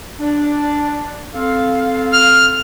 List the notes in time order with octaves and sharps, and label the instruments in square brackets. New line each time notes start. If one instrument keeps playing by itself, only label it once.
[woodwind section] D4
C4 A4 F5
[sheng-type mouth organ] F6